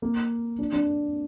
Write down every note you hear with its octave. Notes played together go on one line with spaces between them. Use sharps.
A#3
D4
D4